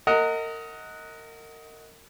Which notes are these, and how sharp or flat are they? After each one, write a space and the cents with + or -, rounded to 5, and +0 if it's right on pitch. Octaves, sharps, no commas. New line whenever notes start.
A#4 -30 D#5 +20 F#5 -5